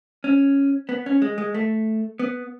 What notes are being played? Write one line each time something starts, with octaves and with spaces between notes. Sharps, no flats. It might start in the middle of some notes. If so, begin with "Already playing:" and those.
C#4
B3
C#4
G#3
G#3
A3
B3